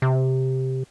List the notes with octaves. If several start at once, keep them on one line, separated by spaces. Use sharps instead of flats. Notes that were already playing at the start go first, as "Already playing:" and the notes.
C3